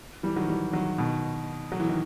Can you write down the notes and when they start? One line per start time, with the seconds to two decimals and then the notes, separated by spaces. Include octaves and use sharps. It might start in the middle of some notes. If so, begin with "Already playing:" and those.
0.23 E3 G3
0.36 D#3 F#3
0.48 E3 G3
0.73 D#3 F#3
0.98 B2 D#3
1.72 F#3
1.80 E3
1.89 D#3